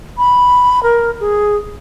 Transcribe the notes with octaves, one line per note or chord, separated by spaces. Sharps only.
B5
A#4
G#4